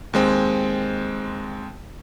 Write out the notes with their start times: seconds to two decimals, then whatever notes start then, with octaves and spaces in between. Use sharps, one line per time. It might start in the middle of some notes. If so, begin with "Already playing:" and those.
0.13 D#2 G#3 C4